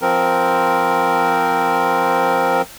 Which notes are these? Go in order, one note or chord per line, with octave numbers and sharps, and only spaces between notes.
F3 C4 A#4